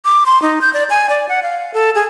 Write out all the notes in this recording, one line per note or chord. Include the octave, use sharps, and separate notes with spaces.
D6
C6
D#4
G6
D5
G#5
D5
F#5
F5
A4
G#4